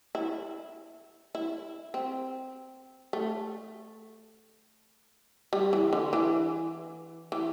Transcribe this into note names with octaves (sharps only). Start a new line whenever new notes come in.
E4
E4
C4
A3
G3
E3
D3
E3
E3